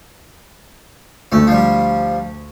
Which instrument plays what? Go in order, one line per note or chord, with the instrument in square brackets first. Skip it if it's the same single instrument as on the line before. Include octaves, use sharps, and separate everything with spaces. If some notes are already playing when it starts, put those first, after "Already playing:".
[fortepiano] D2 [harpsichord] A3
[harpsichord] F3 G3